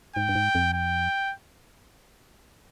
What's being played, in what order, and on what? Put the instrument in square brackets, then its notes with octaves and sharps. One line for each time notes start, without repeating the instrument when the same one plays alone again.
[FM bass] G#2 [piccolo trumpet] G5
[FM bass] G2
G#2
F2
[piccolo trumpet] G5